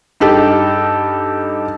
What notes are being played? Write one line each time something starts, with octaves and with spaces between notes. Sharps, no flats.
G2 D#4 G4 A4